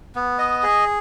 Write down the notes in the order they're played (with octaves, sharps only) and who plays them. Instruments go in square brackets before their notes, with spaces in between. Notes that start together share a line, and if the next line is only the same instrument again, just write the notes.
[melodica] B3
D#5
G#4